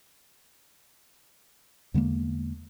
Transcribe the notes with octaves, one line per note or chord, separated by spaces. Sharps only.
E2 D3 G#3 A#3